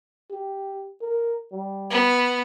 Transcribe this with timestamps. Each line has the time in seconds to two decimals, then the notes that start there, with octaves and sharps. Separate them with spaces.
0.31 G4
1.01 A#4
1.52 G3
1.90 B3